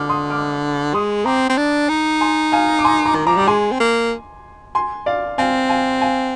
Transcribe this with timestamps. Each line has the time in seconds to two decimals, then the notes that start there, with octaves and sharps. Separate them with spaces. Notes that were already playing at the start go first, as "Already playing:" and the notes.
Already playing: D3 D6 F6
0.09 C6 D#6
0.30 D6 F6
0.94 G#3 C6 D#6
1.25 C4 A#5 D6
1.49 C4
1.57 D4
1.89 D#4
2.21 G#5 C6
2.52 F5 G#5
2.79 D6
2.85 G#5 C6
3.06 A#5 D6
3.15 D#3
3.26 F3 A#5 D6
3.37 G3 D6
3.48 G#3 G#5 C6
3.72 C4
3.80 A#3
4.75 G#5 C6
5.06 D5 F5
5.38 C4 F5 G#5
5.70 F5 G#5
6.02 F5 G#5